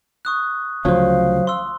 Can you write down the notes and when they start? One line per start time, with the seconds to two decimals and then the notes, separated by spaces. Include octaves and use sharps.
0.25 C#6 D#6 F#6
0.85 D2 C#3 F3 F#3 C5 F5
1.47 C6 E6